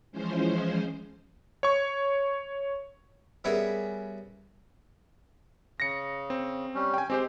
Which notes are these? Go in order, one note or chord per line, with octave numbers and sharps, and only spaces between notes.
E3 F3 G#3 C#4 C5
C#5 C#6
G3 B3 C#4 G#4 A#4 E5
C#3 A#6 C#7
C4
G3 C#4
G5 G#5
G#3 C4 G4 C5